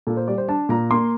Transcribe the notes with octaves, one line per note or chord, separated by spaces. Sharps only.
A#2 A4
C5
G3 D5
C5
D4 A5
A#2 A#5
A#3 C6